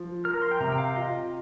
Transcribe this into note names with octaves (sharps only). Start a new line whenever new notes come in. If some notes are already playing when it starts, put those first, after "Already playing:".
Already playing: F3
A#4 F6
A#5
C6
G5
C3 A#5
G5
F5
F4 D#5